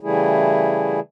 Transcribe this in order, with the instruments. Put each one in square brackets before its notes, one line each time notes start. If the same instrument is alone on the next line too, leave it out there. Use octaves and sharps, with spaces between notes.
[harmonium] C#3 E3 G3 A3 E4 G#4